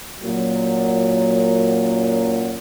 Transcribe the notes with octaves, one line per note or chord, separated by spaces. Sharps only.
F#2 A#2 F#3